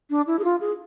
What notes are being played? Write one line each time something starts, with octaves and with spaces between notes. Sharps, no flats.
D4
E4
G#4
F4
G#4